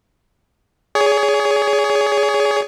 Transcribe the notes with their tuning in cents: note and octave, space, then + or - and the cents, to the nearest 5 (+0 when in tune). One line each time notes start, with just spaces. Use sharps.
G#4 +0 C#5 +35